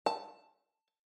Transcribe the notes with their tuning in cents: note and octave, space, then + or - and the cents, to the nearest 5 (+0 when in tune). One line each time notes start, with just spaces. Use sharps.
A5 +10